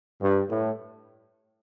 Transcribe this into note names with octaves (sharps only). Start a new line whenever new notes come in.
G2
A2